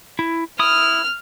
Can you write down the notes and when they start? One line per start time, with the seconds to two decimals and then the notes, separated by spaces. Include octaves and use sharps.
0.19 E4
0.59 E4 D#6 F6